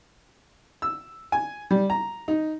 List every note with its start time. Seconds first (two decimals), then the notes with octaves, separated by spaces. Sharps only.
0.82 E6
1.32 G#5
1.71 G3
1.90 A#5
2.28 D#4